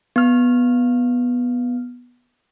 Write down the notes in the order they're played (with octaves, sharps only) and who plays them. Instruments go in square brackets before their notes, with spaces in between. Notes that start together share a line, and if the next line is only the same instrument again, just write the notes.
[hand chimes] B3 F6